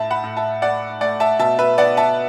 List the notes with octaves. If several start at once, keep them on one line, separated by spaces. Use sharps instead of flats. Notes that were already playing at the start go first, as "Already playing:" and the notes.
Already playing: A2 E5 A5
F#5 B5
A2
E5 A5
A3 D5 F#5
A3 D5 F#5
E5 A5
B2 E5 A5
B4 E5
B3 D5 F#5
E5 A5